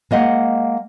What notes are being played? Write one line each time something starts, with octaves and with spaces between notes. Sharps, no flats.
G#3 A#3 D#5 F#5